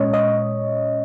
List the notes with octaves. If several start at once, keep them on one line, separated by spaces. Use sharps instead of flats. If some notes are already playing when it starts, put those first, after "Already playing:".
Already playing: A#2 G#3 C#4 C#5 D#5
D#5